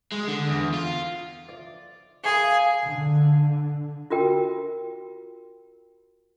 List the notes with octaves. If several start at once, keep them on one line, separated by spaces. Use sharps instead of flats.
G#3
D3
E2
F4
D5 A6
G#4 A#4 F5 B5
D3
F4 F#4 A#4 G5